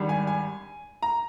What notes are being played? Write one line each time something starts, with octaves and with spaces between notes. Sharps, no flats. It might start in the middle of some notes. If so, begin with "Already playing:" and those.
Already playing: G#1 G2 G3
G#5
G#5
A#5